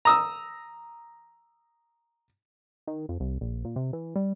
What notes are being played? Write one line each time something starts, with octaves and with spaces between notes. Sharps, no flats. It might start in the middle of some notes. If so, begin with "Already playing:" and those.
A#5 D#6 E6
D#3
F2
C2
A#1
A#2
C3
E3
G3